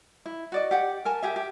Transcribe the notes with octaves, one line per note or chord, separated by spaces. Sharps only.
E4
F#4 D5 D#5
G4 F#5
A#4 G#5 A5
G4 G#4 E5
G4